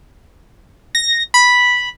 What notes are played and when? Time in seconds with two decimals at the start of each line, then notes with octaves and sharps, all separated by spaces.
0.95 A#6
1.34 B5